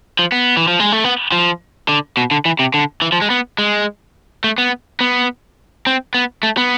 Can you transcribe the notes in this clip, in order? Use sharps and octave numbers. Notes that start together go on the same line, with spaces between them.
F3
B3
E3
F3
G#3
A3
B3
F3
D3
B2
D3
E3
C3
D3
E3
F3
G#3
B3
G#3
A3
B3
B3
C4
B3
A3
B3